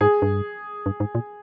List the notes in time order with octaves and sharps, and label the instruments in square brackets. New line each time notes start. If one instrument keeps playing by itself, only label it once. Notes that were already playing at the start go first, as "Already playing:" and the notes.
[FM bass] G#2 [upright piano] G#4
[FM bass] G2
G2
G#2
A#2